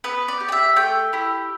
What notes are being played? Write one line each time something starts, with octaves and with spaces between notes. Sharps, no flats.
B3 B4
D5
G4
G5
E5
A3 G5
E4 G4